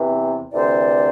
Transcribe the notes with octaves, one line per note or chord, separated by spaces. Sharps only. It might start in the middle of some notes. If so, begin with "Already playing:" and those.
Already playing: E2 C3 E3
D2 C3 E3 C5 D5